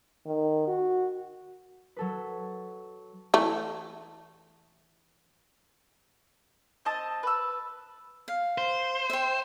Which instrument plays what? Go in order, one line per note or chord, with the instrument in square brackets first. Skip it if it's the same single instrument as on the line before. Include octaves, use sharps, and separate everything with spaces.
[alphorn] D#3
F#4
[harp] F#3 A4 B4
[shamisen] E3 A3
[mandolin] C4 D#5 A5
B4 E6
[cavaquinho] F5
[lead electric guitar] C5
[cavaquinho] E5 G5